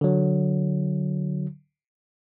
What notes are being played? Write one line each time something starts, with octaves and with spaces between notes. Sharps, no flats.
D3 F#3